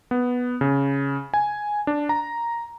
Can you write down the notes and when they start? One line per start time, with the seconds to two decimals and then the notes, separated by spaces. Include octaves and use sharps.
0.11 B3
0.61 C#3
1.34 G#5
1.87 D4
2.09 A#5